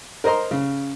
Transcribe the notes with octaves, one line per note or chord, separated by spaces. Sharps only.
A#4 C5 D#5 A#5 C6
C#3